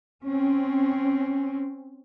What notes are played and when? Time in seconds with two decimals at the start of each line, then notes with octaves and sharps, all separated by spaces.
0.25 C4 C#4